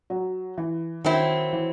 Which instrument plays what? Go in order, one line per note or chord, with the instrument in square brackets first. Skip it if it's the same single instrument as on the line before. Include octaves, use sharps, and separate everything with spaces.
[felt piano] F#3
E3
[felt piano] D#3 [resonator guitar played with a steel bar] F#3 C4 E4
[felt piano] E3